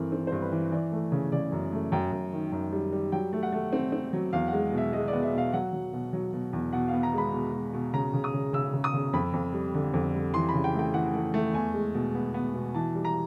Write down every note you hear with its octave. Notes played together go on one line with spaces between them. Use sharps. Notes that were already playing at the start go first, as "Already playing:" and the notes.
Already playing: G2 E3 C4 A4 A#4
C4
G2 C5
B4
E3
E3 D5
A3
C#3
C#3 D5
F#2
A3
F#2 G5
F#2
D#3
F#2
G3
G3
F#3 G5
A3
F#5
A3
C4
C4
F#3
E2 F5
F#5
G#3
B2
E5
G#3 D#5
D5
B3
E5
B2 F5
F#3 F#5
F#3
B2
F#3
B2
E2
B2 F#5
F5
B3
A#5
G#3 B5
B2
B2
B2
C#3 A#5
C#3
D#6
C#3
C#3 E6
C#3
D#6
C#3
F2 B5
F2
G3
D3
F2
G3
E3 C6
B5
C#3
G5
A3 G5
E3 F#5
A3
A3
E2 G#5
G#3
B2
B3
B3
B2
E3 A5
G3
A#5